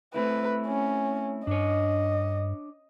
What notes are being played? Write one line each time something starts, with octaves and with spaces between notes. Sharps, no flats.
A3 C4 E4 B4
C#4
G2 D4 C#5 D#5